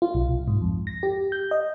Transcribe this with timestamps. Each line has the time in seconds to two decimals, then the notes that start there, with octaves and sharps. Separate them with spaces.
0.02 F4
0.14 B1
0.29 C2
0.48 G#2
0.61 F2
0.87 A#6
1.03 G4
1.32 G6
1.51 D#5